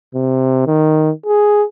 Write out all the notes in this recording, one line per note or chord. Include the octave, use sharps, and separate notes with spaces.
C3
D#3
G#4